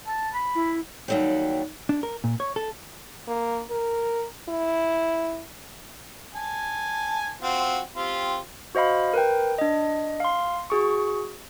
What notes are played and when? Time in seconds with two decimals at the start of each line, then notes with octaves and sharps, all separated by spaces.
0.06 A5
0.34 B5
0.55 E4
1.08 D#2 F#3 G3
1.89 D4
2.03 A#4
2.24 A#2
2.40 C#5
2.56 A4
3.28 A#3
3.71 A#4
4.49 E4
6.35 G#5 A5
7.42 C4 F4 F#4
7.96 C4 F4 G4
8.75 F#4 C5 D#5 F5 B5
9.13 A#4 B4 G5
9.58 D4 D#5
10.20 F5 C6
10.70 F#4 G#4 C#6